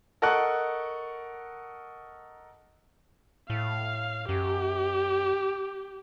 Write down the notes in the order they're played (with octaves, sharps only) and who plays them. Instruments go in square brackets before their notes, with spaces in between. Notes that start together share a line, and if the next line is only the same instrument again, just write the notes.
[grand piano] A4 A#4 D#5 F#5 C#6 F#6
[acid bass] A2 [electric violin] F5
[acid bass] F#2 [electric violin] G4